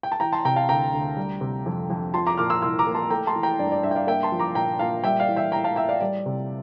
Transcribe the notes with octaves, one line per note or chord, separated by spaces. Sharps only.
G5
A5
E3 G5 A#5
A5 C6
C3 G5 A#5
F5 A5
D2 G5 A#5
D2
G3
C3
F2
F2
F3 A5 C6
A#5 D6
A#2 D6 F6
C6 E6
C2 C6 E6
A#5 D6
A#3
A5 C6
A3 G5 A#5
A5 C6
E3
G5 A#5
G2 D5
D5
G2 E5
G5
D5 F5
A#3 E5 G5
A5 C6
F3
A#5 D6
A#2 G5 A#5
A#2 F5 A5
G3 E5 G5
D5 F5
E3
E5 G5
A2 G5 A#5
F5 A5
A2 E5 G5
D5 F5
G3 D5
C3